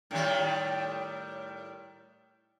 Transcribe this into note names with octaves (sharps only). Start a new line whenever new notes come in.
A2 D#3 G3